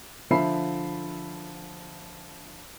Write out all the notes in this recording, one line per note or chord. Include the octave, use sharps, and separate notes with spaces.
D3 F3 F4 E5 B5 C7